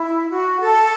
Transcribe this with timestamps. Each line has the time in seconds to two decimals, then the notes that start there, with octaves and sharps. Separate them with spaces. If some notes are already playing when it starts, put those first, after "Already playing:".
Already playing: E4
0.30 F#4
0.60 A4